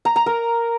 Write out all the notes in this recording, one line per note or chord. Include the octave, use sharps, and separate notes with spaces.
A#5
A#5
A#4